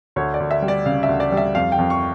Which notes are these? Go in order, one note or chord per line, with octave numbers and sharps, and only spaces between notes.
D2 C#5
D5
D2
E5
G3
D5
C#3 F5
E5
D2
D5
G3
E5
F2 F5
G5
F2
C#6